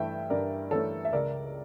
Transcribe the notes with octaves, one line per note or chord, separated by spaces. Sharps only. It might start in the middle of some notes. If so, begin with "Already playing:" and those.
Already playing: G2 E3 A3 E5 G5
G2 A#4 D5
E3 A3 A4 C#5
E5
C#2 A#4 D5